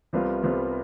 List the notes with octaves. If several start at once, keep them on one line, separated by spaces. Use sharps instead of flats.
C2 C3 G3 B3 F4
C2 C3 G3 B3 F4